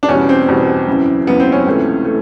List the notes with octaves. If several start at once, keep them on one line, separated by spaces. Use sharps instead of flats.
D4
E2 B2 G3 C#4
C4
E2 B2 G3
F#2 C#3 E3
F#2 C#3 E3 B3
C4
C#4
C#2 C3 E3 A3
E3 A3